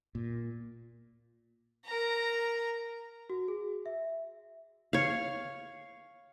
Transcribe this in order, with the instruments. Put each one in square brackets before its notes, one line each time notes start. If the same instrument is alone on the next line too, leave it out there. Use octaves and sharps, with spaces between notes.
[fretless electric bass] A#2
[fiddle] A#4 A#5
[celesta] F#4
G#4
E5
[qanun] C#5 F5